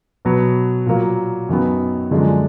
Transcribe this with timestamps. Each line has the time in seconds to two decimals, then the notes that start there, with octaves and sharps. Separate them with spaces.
0.25 B2 F#3 B3
0.86 A#2 F#3 A#3
1.49 F#2 D#3 F#3 B3
2.11 F#2 D3 F3 G#3 D4